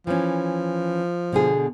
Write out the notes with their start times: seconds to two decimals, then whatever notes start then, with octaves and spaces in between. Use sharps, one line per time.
0.07 E3 F3 C#4
1.32 B2 D3 G#4